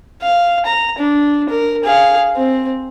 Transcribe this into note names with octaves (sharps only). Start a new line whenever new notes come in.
F5
A#5
D4
A#4
G#4 F5
C4